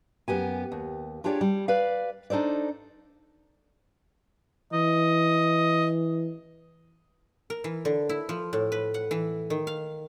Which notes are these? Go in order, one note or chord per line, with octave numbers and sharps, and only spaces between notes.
F#2 B3 G4 G#5
D#2
D4 F4 G4 G#4 C#5 D5
G3
B4 D5 F5
D4 D#4 A4 C5 D5
E3 D#5
A#4
E3
D3
E4
F3
A2
B4
F#5
E3
D#3
F5